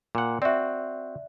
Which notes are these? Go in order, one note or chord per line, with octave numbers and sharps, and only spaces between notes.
A#2 F#5
C4 F#4 D5 E5